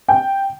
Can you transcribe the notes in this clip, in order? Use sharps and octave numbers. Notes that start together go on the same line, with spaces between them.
G5